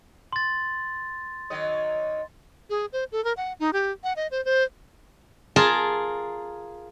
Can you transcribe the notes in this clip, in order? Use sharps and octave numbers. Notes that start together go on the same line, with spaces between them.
C6 A6
D#3 F#3 D#5
G#4
C5
A4
A#4
F#5
D#4
G4
F#5
D#5
C5
C5
F4 G#4 A#4 A5